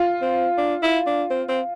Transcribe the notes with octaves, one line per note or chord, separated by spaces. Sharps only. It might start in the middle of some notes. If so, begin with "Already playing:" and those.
Already playing: F4
C4
D4
E4
D4
C4
C4